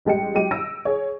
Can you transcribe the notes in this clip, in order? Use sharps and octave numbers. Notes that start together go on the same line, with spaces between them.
A1 G3 G#3 G5 C#7
F#3 G#3 G4 D#7
E6 A#6 D7
G#4 C#5